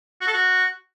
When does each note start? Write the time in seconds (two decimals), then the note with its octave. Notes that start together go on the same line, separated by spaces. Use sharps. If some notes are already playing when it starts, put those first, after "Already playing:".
0.21 F#4
0.27 A4
0.33 F#4